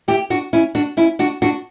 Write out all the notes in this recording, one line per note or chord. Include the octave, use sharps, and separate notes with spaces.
E4 G4
D4 F#4
C#4 E4
D4 F#4
C#4 E4
D4 F#4
D4 F#4